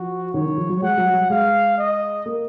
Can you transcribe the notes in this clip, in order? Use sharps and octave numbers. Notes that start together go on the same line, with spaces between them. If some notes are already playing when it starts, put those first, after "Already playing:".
Already playing: F3 F#4
D#3 C#5
D#3
F3
F#3
G#3 F#5
F#3
F#3
G#3 F5
D#5
A#3